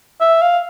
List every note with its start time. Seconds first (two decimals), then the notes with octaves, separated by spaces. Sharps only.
0.21 E5
0.42 F5